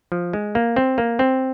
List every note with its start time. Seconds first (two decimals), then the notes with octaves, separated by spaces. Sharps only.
0.12 F3
0.33 G#3
0.55 A#3
0.76 C4
0.98 A#3
1.19 C4